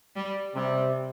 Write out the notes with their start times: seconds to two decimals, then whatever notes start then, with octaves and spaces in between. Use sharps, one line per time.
0.16 G3
0.56 C3 G3